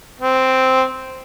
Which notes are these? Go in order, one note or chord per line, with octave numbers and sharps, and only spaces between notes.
C4